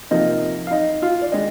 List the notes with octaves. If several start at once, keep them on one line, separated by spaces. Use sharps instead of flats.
C3 F3 A#3 D#4 D#5
F5
D#4 D#5
F4 F5
D5
D#3 G#3 D4 D#4 D#5